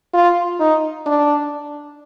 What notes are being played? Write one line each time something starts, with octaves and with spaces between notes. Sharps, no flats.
F4
D#4
D4